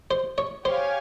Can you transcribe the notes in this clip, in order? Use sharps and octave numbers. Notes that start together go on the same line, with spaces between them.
C5
C#5
G4 C5 C#5 F5 G#5